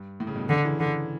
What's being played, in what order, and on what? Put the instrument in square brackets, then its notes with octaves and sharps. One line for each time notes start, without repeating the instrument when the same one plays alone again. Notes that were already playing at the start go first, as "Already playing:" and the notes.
Already playing: [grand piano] G2
A2
C#3
G2 B2
[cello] D3
[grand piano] C#3 E3
[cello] D3